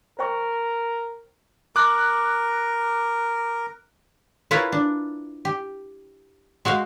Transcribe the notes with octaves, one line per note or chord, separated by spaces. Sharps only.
A#4 C5 G5 C#6
A#4 D6 F#6
E4 F4 A#4 B4 C#5
D4
G4
G#3 F#4 C5 F5